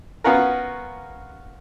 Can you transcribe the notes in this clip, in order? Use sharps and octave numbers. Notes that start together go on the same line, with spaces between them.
B3 C#4 F4 F#4 A#4